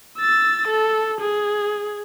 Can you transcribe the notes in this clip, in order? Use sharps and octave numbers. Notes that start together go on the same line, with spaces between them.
E6 A6
A4
G#4